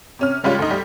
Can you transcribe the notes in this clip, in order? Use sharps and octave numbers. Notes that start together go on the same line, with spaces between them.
C3 C#4 F6
C#3 G3 G#3 C#4 F4
D2 D#4
G3